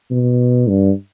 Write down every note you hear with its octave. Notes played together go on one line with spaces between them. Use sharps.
B2
G2